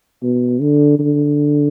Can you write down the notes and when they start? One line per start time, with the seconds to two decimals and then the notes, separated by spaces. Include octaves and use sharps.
0.23 B2
0.61 D3
0.99 D3